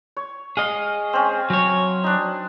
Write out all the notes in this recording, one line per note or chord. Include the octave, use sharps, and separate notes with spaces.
C#5
G#4 D#5 F5
C4 C#4
F#3 C#5
D4 D#4